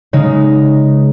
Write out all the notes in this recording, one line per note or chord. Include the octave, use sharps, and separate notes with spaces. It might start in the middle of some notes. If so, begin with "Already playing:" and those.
C#3 G#3 D#4